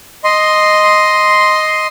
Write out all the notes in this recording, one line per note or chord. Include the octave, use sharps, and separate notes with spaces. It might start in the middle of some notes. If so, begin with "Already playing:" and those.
D#5 C6